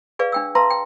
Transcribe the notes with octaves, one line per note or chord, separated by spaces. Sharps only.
G#4 B4 D5 F5
D4 G5 E6
B4 E5 F5 A5 A#5 C6
G5